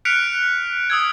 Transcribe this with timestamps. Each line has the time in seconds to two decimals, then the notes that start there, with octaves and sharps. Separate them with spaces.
0.05 F6 F#6 B6 C#7 D7 F7
0.90 D#6 E6 G#6